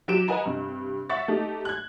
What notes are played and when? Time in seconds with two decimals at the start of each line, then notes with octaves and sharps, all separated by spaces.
0.08 F#3 G4 D7 E7
0.28 B4 D#5 F#5 G#5 A#5
0.46 G2 C3
1.10 E5 F#5 C#6 A6
1.28 A3 D#4 G4
1.65 F#6 G#6